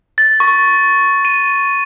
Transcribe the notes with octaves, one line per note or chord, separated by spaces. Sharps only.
A6
C#6
D#7